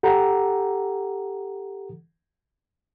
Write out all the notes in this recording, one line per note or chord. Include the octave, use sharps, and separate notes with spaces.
G4 A4 F#5 A#5